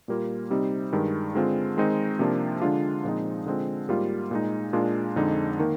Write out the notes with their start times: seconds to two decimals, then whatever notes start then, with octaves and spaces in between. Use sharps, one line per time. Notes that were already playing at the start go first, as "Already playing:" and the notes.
0.08 A#2 G3 A#3 F4
0.50 C3 G3 C4 D#4
0.92 G2 D#3 G#3
1.35 D3 G#3 C4 F4
1.77 D#3 G#3 C4 D#4
2.19 C3 F3 A#3 D4 F4
2.62 D3 G#3 D4 F4
3.04 A#2 F3 G#3 C4 D#4
3.46 D3 G#3 C4 F4
3.88 G#2 G3 A#3 F4
4.31 A#2 G#3 D#4
4.73 A#2 G#3 D4 F4
5.16 F2 D3 G#3 D#4
5.59 D#3 A#3